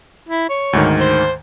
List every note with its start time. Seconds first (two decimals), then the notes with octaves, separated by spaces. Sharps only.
0.29 E4
0.49 C#5
0.73 D2 G#2 D#3
1.00 C5